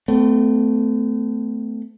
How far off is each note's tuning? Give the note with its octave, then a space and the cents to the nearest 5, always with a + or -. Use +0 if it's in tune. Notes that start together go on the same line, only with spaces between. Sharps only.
A3 +0 C4 -45